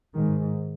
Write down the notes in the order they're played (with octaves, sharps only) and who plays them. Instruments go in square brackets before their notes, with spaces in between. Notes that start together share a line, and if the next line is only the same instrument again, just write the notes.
[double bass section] G#2 D#3